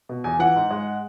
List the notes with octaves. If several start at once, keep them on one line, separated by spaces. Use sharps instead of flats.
B2
E2 G#5
E3 F#5
G#2
G#3